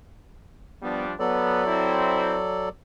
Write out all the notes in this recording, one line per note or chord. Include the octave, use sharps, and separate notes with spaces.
F3 G3 B3 D4
F#3 B3 A4 D5
C4 E4